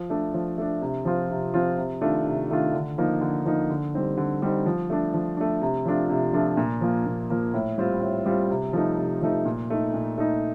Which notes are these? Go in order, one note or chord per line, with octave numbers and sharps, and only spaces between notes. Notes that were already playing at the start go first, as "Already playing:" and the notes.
Already playing: F3
A3 D4
F3
A3 D4
C3
F3 C4 F4
C3
F3 C4 F4
C3
D#3 A3 D4 F4
C3
D#3 A3 D4 F4
D3
F3 A#3 D#4
D3
F3 A#3 D#4
D3
G3 C4 D#4
D3
G3 C4 D#4
F3
A3 D4
F3
A3 D4
C3
F3 A3 D4 F4
C3
F3 A3 D4 F4
A#2
F3 A#3
A#2
F3 A#3
A2
G3 C4 F4
A2
G3 C4 F4
C3
F3 A3 D#4
C3
F3 A3 D#4
A#2
A3 D#4
A#2
A3 D#4